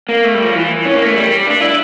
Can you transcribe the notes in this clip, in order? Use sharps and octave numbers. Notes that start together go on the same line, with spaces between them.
A#3
A3
G3
F3
E3
C#4
A#3
A3
G3
D4
E4